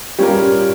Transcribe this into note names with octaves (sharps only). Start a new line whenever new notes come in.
G3 C#4 F4 G4 A#4